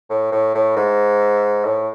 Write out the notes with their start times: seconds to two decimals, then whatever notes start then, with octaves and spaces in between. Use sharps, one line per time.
0.10 A2
0.32 A2
0.55 A2
0.76 G#2
1.65 A2